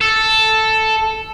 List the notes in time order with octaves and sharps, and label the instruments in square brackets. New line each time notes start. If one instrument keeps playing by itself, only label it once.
[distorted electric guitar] A4